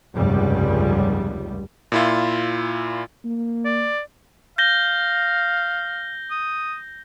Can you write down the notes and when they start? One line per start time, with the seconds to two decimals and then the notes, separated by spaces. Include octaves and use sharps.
0.14 F1 C#2 G2 G3
1.92 A#2 E4 F4
3.24 A#3
3.65 D5
4.58 F5 G6 A#6 G7
6.31 D#6